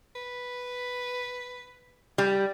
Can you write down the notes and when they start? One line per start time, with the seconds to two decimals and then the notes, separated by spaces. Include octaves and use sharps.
0.16 B4
2.18 G3